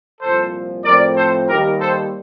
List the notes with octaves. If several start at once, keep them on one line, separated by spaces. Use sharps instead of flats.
C2 A#2 F3 A4 C5
A2 F3 C4 A#4 D5
A4 C5
D#2 D#3 G3 G4 A#4
A4 C5